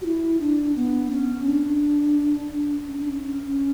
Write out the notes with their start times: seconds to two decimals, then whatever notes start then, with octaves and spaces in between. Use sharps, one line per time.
0.01 F#4
0.06 E4
0.40 D4
0.76 B3
1.11 C#4
1.46 D4
2.88 C#4
2.99 D4
3.11 C#4